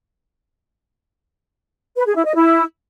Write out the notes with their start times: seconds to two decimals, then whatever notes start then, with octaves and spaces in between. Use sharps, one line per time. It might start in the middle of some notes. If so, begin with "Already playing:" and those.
1.96 B4
2.06 G#4
2.15 E4
2.25 D#5
2.34 E4